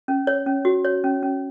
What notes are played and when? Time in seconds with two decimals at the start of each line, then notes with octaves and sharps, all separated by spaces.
0.08 C#4
0.27 C#5
0.46 C#4
0.65 F#4
0.84 C#5
1.04 C#4
1.23 C#4